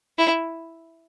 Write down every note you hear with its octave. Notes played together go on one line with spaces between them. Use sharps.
E4